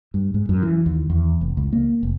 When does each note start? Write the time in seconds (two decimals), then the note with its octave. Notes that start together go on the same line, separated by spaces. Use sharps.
0.14 G2
0.34 G#2
0.49 F#2
0.63 E3
0.86 D#2
1.10 E2
1.41 F1
1.57 C#2
1.73 A#3
2.03 F1